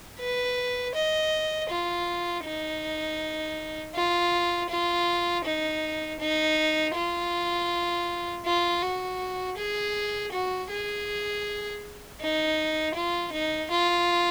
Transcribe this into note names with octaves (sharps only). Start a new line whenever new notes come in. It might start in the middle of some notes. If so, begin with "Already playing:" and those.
B4
D#5
F4
D#4
F4
F4
D#4
D#4
F4
F4
F#4
G#4
F#4
G#4
D#4
F4
D#4
F4